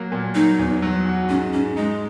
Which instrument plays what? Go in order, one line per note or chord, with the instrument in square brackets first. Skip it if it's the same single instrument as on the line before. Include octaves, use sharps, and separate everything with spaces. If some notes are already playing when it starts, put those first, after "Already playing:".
Already playing: [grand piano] F#3 A#3
A#2
[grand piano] F#3 [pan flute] D#4
[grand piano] E2
F#3
F#4
[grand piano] G#2 [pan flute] C#4
[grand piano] G#2 [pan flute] C#4
[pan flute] G#3 [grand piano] D#4